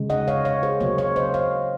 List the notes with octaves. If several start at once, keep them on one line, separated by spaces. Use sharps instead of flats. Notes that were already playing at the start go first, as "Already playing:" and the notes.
Already playing: C#3 G#3
D#5 F#5
C#5 F5
C#5 F5
G#4 C5
C#3 F#3 A#3 C#5 F5
C#5 F5
C5 D#5
C#5 F5